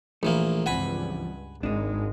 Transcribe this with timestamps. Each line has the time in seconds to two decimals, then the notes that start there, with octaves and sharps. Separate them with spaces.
0.23 A#1 E3 A3 A#3
0.66 C#2 G2 E3 F3 C4 F#5 G#5 B5
1.63 G#1 G#3 D4 D#4